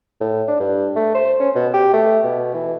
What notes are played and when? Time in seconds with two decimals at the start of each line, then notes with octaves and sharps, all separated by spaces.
0.21 A2
0.48 D4
0.60 G2
0.96 A3
1.15 C5
1.40 C#4
1.55 B2
1.74 G4
1.94 A3
2.24 B2
2.54 E3